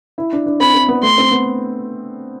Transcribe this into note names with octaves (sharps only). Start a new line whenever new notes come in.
E4
D4
D4
C4 B5
C4
B3
A3 C6
C4
B3